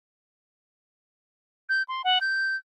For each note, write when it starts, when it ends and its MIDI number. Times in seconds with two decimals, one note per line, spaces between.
1.69 1.83 91
1.88 2.02 84
2.04 2.19 78
2.21 2.56 91